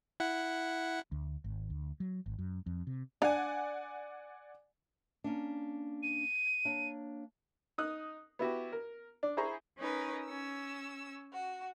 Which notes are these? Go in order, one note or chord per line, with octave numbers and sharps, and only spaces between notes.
E4 F#5
D2
G#1
D2
F#3
G#1
F#2
F2
C3
D4 D5 F5 F#5 G#5
A#3 C#4 D4
D#7
A#3 D4 C#5
D#4 D#6 F#6
B3 E4 F#4 G4
A#4
D4
E4 G#4 C5 A#5 B5 C#6
C#4 D#4 A#4 B4
C#4 E6
F#4